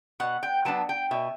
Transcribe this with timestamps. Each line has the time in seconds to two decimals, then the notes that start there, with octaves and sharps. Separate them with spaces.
0.20 B2 F#5
0.43 G5
0.65 F#3 B3 D4 A5
0.89 G5
1.11 B2 E5